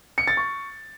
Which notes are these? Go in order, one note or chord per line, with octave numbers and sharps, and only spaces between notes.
C#7
A6
C#6